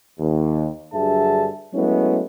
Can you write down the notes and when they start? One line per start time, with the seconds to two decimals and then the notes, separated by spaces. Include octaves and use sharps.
0.20 D#2
0.93 G2 D3 F#3 G#4 E5 A5
1.73 F#3 G#3 A3 B3 C#4 E4